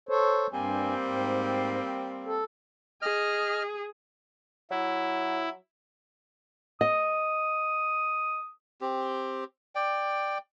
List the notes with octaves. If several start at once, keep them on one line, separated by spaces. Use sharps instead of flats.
A4 C5 C#5
G2 G3 A#3 C4 G#5
G#2
A4
G#4 D#5 F6
F#3 E4
D#5 D#6
C4 G4
D5 G5